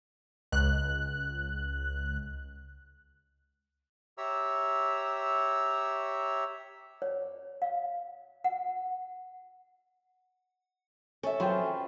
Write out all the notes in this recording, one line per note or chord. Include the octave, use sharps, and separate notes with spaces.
C#2 F#6
G4 C#5 E5 A#5 E6
C#5
F5
F#5
C#4 A4 E5
F#3 C4 F4 G#4 B4 G5